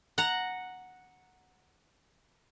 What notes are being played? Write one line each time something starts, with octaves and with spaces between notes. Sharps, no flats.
F#5 A#5